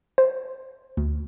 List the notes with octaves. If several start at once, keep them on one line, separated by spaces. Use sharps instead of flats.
C5
D2